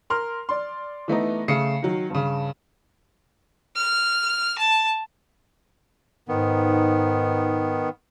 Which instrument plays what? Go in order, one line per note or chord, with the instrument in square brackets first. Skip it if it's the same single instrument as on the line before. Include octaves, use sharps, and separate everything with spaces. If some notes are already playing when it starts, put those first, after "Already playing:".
[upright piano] A#4 C6 F6
D5 C6
E3 A3 B3 D#4
C#3 A3 C7 C#7
D#3 F#3
G2 C#3
[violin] F6
A5
[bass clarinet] G#2 [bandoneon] D#3 B3